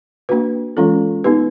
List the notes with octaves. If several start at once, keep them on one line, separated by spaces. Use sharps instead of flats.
A#3 D4 F#4 B4
E3 G#3 C#4 F4 A4
B3 D#4 G4 B4